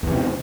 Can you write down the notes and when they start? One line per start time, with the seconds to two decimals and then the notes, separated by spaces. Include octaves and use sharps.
0.03 E2
0.07 E3
0.12 C3